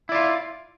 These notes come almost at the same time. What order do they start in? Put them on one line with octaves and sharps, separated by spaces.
E4 D5 F4